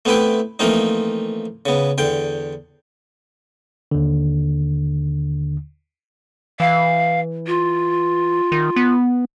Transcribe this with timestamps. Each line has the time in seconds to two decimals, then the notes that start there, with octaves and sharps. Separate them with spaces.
0.05 A3 B3 C4 E4 B4 G5
0.59 E3 F3 A3 A#3 C4 D#4
1.66 C#3 B3
1.98 E2 D3 G5
3.91 D#2 D3
6.60 E3 F5
7.47 F4
8.52 D#3
8.76 B3